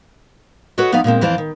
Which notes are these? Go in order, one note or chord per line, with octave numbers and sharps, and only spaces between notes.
F#4 A4 B4 C#5 D#5
F3 B3 D#4 D5 F5
A#2 G#3 A#3 C4
F2 E3 C5 D5 F5 A5
D#3